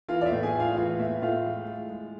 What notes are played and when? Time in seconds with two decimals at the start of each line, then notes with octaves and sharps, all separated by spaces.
0.08 E3 F4 F5
0.21 D5
0.26 E5
0.32 A2
0.43 G#4 G#5
0.54 A2
0.60 F4 F5
0.77 E3 F4 F5
0.99 A2 E5
1.22 A2 F4 F5
1.45 G#3
1.67 G#3
1.90 G#3